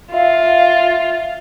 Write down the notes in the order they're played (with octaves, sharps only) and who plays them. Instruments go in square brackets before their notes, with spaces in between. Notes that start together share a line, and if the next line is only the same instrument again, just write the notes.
[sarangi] F4 [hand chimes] E5 [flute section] F5